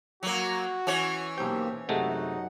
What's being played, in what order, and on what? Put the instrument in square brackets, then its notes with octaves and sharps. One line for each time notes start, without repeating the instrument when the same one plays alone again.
[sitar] F#3 A#3 [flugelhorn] F#4
[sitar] E3 C#4 C#5
[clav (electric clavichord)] B1 G5 [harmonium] A#3 G4 C5
[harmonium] F#2 F#5 [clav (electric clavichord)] C3 G#3 A3 [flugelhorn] D#4